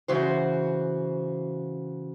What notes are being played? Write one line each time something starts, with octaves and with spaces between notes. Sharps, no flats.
C#3 E3 F#4 C5